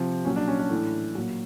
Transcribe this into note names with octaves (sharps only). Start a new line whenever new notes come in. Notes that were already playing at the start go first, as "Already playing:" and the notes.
Already playing: C3 F3
A#2 F#3 C#4
D4
C#4
D4
A2 E3
A#2 F#3